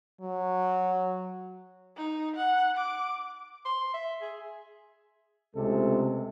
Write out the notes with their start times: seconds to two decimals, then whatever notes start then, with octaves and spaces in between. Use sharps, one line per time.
0.21 F#3
1.97 D#4
2.36 F#5
2.77 D6
3.65 C6
3.94 E5
4.21 G#4
5.56 C#2 C3 G#3 A3 A4